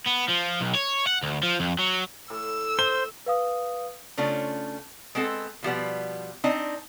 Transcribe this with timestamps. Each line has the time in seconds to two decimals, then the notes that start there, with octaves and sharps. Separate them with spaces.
0.06 B3
0.28 F3
0.60 B1
0.75 C#5
1.07 F#5
1.23 D2
1.43 F3
1.60 F2
1.79 F#3
2.30 A2 A4 D6 E6
2.79 C5 G7
3.26 B4 F5 D#6
4.17 C#3 A3 C#4 D4 F4
5.15 G#3 B3 C4 A4
5.63 B2 F3 G3 B3
6.44 C4 D4 D#4 D#5